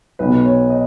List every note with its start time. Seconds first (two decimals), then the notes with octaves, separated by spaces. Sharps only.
0.19 B1 B2 B4
0.45 C#5
0.70 D#5